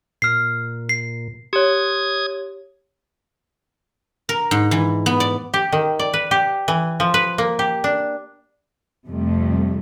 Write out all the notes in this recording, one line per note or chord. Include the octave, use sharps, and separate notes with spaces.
A#2 F6 C7
C7
G4 C#5 D#6 G#6
A#4
G#2
E3
B3
D5
G4
D#3
D5
B4
G4
E3
F3
B4
A#3
G4
D4
F2 C3 G3 A3